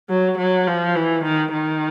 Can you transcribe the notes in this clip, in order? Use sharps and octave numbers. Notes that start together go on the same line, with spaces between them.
F#3
F#3
F3
E3
D#3
D#3